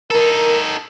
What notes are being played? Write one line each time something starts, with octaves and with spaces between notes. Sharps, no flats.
D#4 A4 A#4